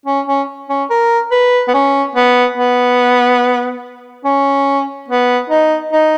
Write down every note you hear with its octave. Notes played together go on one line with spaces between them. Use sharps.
C#4
C#4
C#4
A#4
B4
B3
C#4
B3
B3
C#4
B3
D#4
D#4